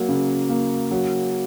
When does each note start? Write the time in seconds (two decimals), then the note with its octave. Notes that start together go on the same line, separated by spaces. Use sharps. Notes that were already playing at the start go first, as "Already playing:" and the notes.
Already playing: F#3 A#3
0.08 C#3
0.49 A#3
0.91 F#3